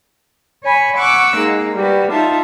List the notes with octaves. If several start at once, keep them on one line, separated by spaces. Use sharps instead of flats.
C#5 G#5 B5
F#5 C#6 D6 E6 F#6
G#3 A#3 D#4
G3 F#4 B4
D#4 F4 E5 A5